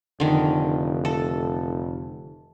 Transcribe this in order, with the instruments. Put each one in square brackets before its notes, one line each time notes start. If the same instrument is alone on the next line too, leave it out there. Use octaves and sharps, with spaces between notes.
[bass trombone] F1 [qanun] D3 D#3
[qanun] A4